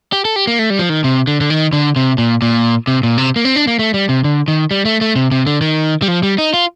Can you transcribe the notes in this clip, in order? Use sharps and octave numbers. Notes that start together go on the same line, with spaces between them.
G4
A4
G4
A#3
A3
G3
F3
D#3
C3
D3
D3
D#3
D3
C3
A#2
A#2
C3
A#2
C3
A#3
C4
D4
A#3
A3
G3
C3
D3
D#3
G3
A3
A3
C3
C3
D3
D#3
G3
F3
G3
D#4
F4